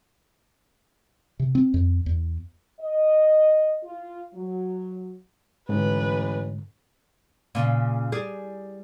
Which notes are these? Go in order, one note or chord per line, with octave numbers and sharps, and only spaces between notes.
C3
C4
F2
E2
D#5
F4
F#3
A1 G#2 D3 B4
A#2 C#3
G3 G#4